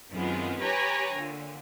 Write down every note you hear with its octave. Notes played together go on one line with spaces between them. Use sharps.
F#2 D#3 G#3 B3 C4 F4
G4 B4 C#5 G5 G#5 A#5
A#2 D3